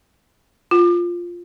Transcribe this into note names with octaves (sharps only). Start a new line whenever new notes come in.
F4